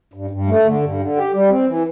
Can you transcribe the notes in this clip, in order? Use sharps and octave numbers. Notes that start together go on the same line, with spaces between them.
G2
G2
A3
D3
G2
D3
G4
G3
C4
E3